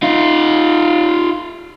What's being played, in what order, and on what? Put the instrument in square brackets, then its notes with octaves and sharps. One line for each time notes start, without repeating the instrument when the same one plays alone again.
[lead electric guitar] D#4 F4